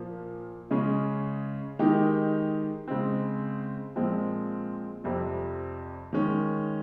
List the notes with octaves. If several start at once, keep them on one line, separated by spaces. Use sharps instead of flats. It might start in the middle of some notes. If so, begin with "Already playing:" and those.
Already playing: A#2 F3 A#3
C#3 G#3 C#4 G#4
D#3 G#3 D#4 G4
C#3 G#3 C4
A#2 F3 G#3 C4
F2 C3 G3 C4
D#3 G#3 C#4